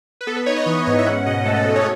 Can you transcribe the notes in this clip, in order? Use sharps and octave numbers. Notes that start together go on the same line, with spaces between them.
B4
B3 A4
B4
D#4 C#5
D#5
E3 C#5
G#2 D#5
E5
C#4 F#5
B2 D#5
A3 A4
A4
B2
C#5